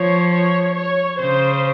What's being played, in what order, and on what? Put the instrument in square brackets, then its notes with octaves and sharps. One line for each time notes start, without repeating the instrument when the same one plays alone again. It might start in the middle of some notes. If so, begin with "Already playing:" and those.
Already playing: [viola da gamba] F3 [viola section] C#5
[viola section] C#5
C#5
[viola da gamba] C#3 [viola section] C5